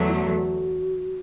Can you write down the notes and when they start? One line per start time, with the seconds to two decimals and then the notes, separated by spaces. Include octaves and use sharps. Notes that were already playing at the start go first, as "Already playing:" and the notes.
Already playing: E2 D3 F#3 A3
0.08 E4
0.15 F#4